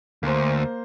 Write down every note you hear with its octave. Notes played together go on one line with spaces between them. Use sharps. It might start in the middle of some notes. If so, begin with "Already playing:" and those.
D2 A#3 C5